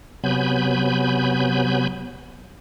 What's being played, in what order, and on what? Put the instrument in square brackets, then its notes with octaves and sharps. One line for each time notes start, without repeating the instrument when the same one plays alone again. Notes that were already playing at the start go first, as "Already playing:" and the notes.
[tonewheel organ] C3 F#3 B3 G#5 B5 G6